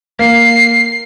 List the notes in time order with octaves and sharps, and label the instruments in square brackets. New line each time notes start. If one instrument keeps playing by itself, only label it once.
[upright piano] A#3 [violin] C7